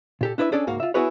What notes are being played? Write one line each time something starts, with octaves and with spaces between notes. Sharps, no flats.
A#2 G4 A4
D4 E4 B4 D5 E5
C#4 D4 G#4 A4 C#5 D5
C#2 G#2 A#3 F#4 F5
F4 E5
B3 E4 F#4 G#4 B4 C#5